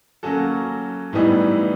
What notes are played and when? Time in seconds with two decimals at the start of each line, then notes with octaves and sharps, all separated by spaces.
0.23 F#3 A#3 C#4 F#4 A4
1.13 A2 E3 G3 B3 D#4